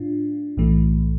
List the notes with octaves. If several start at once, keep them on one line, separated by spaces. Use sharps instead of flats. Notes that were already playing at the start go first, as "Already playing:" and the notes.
Already playing: A2 D4 F4
B1 A2 E3 A3